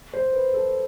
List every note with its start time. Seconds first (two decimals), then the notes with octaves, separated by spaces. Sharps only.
0.13 C5
0.33 B4
0.53 A4